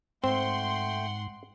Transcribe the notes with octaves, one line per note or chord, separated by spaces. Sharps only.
G#2 A3 C4 F#5 G5 C6